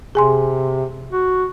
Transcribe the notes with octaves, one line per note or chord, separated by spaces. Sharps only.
C3 G#4 G#5 C6
F#4